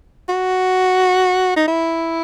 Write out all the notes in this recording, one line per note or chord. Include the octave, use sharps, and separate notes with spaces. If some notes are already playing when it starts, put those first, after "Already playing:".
F#4
D#4
E4